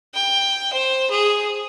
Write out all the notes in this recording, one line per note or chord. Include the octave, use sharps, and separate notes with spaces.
G5
C5
G#4